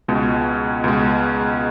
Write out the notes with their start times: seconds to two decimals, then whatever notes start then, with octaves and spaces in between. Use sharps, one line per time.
0.08 C#2 B2 G#3
0.84 C#2 B2 G#3